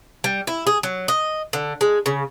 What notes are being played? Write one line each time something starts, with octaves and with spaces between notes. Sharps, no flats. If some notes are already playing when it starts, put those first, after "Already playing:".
G3
E4
G#4
F#3
D#5
D3
G#3
C#3